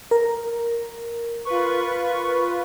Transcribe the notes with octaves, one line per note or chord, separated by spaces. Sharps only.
A#4
F4 B4 C#6